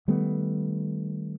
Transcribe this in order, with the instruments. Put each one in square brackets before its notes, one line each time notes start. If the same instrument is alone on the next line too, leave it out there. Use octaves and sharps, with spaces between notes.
[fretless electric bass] D#3 G3 A3 B3